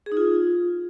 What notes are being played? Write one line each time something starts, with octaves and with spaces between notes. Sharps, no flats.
G#4
D#4
F4